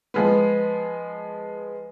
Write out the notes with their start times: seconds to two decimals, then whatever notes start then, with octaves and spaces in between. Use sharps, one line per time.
0.14 F3 G#3 B3